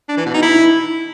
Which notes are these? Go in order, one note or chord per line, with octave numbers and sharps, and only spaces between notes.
D4
E3
B2
D#4
E4